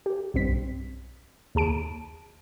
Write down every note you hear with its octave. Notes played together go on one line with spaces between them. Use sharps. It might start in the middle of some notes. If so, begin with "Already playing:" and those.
G4
B1 G2 C4 B6
D#2 G#4 A5 D7